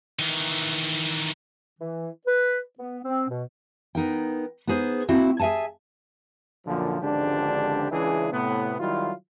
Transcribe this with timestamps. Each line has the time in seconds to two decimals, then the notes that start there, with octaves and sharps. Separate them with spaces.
0.19 D#3 E3
1.79 E3
2.26 B4
2.78 B3
3.05 C4
3.28 B2
3.95 B3 D#4 A#4 G5
4.67 B3 D#4 G#4 C5
5.08 A#3 C4 E4 F#4
5.39 G#4 E5 F#5 G#5 A5
6.66 F#2 A#2 D3 F3
7.01 G#1 C#2 D3 F3 D4 G4
7.91 C#2 C#3 E3 D4 E4 G#4
8.32 A2 C3 B3
8.80 D#3 F#3 G3 E4 F4